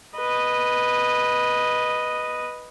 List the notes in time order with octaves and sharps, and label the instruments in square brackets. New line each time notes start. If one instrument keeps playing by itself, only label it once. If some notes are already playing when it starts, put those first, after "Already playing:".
[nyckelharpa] B4 D#5